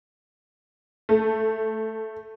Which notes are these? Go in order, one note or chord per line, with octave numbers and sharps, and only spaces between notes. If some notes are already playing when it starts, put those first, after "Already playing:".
A3